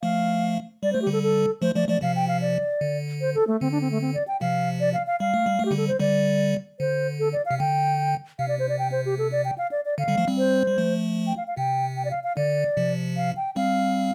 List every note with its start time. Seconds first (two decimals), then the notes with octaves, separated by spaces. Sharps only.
0.02 F3 A3 F5
0.83 G3 D5
0.93 A3 C5
1.02 G4
1.06 D3 G3
1.12 A4
1.23 A4
1.62 F3 A3 C5
1.75 F3 A3 D5
1.89 F3 A3 D5
2.02 C3 F3 F5
2.16 G5
2.28 F5
2.42 D5
2.81 D3
3.21 C5
3.35 A4
3.47 A3
3.61 D3 C4
3.72 D4
3.81 C4
3.91 A3
4.01 C4
4.14 D5
4.28 G5
4.41 C3 F3 F5
4.80 D5
4.93 F5
5.07 F5
5.20 G3 F5
5.34 A3
5.46 G3
5.59 A3
5.65 G4
5.71 D3 G3
5.77 A4
5.88 C5
6.00 D3 G3 D5
6.80 D3 C5
7.20 A4
7.33 D5
7.45 F5
7.51 C3
7.59 D3 G5
8.39 C3 F5
8.48 D5
8.59 C5
8.69 D5
8.79 G5
8.92 C5
9.05 G4
9.18 A4
9.32 D5
9.45 G5
9.58 F5
9.71 D5
9.85 D5
9.98 D3 F5
10.08 D3 G3
10.17 F3 A3
10.28 G3 C4
10.38 C5
10.66 G3
10.78 F3 A3
11.27 G5
11.37 F5
11.47 F5
11.57 C3 G5
11.97 G5
12.05 D5
12.11 F5
12.24 F5
12.37 D3 D5
12.77 C3 F3
13.17 F5
13.37 G5
13.56 G3 C4 F5